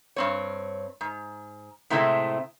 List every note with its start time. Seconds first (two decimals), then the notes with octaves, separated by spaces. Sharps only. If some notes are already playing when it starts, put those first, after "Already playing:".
0.16 G2 C4 C#5
1.01 G#2
1.90 A2 C3 G#3 A3 C4 E4